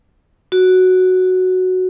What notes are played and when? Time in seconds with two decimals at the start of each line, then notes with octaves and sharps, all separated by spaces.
0.52 F#4